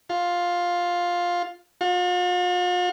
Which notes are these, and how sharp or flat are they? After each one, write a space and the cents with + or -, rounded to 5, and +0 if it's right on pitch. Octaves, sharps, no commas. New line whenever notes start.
F4 +10
F4 +45